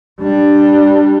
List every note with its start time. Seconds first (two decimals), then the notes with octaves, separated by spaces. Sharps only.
0.21 G3 D4